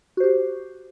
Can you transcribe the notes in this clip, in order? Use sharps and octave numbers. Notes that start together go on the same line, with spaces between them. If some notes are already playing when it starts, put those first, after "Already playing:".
F#4 G4 C5